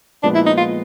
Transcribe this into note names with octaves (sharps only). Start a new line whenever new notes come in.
A#2 F3 G#3 B3 D4
E4
D#4
F4